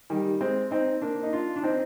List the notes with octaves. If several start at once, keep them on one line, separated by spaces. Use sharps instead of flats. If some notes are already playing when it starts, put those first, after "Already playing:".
D#3 G3
G#3 C4
C4 D#4
A#3 D4
D#4
D4 F4
D4
C4 D#4